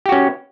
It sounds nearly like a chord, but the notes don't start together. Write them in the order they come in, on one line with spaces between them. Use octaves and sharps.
G4 F#4 C#4